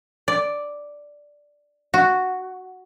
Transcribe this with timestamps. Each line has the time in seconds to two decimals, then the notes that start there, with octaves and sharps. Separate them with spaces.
0.28 D5
1.94 F#4